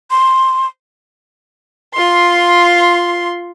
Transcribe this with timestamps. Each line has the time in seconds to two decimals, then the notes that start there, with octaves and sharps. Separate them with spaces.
0.10 C6
1.94 F4 C6